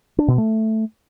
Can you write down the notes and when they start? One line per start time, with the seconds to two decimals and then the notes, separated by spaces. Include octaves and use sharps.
0.18 D4
0.28 B2
0.38 A3